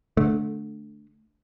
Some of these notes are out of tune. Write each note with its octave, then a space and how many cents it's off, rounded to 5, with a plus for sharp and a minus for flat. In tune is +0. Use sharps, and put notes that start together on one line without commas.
D3 +0 A3 -20